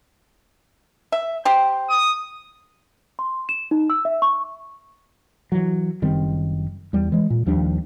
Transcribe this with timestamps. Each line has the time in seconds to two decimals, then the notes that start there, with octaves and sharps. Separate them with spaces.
1.12 E5
1.45 G4 C5
1.89 D#6
3.19 C6
3.49 E7
3.71 D#4
3.90 E6
4.05 E5
4.22 C#6
5.52 E3 F#3
6.02 F#1 D#3 G3 C4
6.93 E2 G3
7.12 E3 G#3
7.30 A#2
7.46 D#2 F3 G3 D4